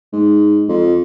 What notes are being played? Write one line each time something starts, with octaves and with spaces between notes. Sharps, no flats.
G#2
F2